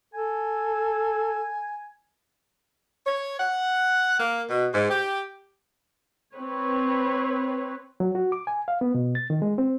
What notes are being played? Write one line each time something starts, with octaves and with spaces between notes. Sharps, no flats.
A4 G#5
C#5
F#5
A#3
B2
G#2
G4
C4 B4 C#5
F#3
F#4
D6
G#5
F5
B3
B2
A6
D#3
G#3
C4